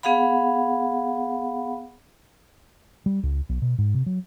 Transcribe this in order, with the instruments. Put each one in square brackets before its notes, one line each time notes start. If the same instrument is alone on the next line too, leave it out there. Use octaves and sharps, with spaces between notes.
[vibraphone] B3 G#4 F5 F#5 B5
[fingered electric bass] G3
C#2
B1
B2
G#2
C3
F#3